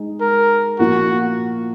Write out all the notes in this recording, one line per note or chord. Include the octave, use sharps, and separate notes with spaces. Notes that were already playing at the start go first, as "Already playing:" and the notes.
Already playing: G#3 D#4 G#4
A#4
A#2 F3 A#3 F4 F#4 A#4